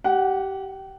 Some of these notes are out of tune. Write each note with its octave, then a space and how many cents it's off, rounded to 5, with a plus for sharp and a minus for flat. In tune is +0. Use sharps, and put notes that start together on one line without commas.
G4 -25 F#5 +0